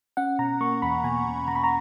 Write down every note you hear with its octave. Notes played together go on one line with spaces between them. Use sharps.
C#4 F#5
B2 A#5
A#3 C#6
E2 B5
B2 G#5
B2
B2 A#5
B5
A#5